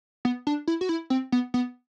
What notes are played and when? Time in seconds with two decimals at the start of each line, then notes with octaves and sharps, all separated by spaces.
0.25 B3
0.47 D4
0.67 E4
0.81 F#4
0.89 E4
1.10 C4
1.32 B3
1.54 B3